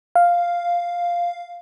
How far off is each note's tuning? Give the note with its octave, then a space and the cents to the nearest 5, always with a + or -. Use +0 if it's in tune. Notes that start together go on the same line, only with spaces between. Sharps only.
F5 +0